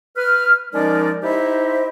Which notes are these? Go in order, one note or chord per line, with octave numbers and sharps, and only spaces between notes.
B4 F6
F3 G#3 C#4 D#4 A#4 D5
D#4 E4 G4 C5 D#5 E5